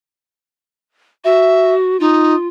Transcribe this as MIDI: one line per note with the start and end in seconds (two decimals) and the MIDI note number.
1.24 1.99 66
1.24 1.74 76
2.00 2.34 63
2.00 2.48 65